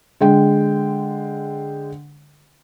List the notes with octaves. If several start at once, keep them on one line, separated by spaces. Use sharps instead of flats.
D3 G#3 G5